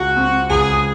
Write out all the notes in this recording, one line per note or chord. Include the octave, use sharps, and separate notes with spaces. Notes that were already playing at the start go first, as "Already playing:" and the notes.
Already playing: C#2 F#4
C4
C#2 G#4